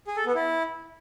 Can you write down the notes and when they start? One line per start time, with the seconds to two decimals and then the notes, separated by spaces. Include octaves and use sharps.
0.07 G#4
0.17 A4
0.26 B3
0.35 E4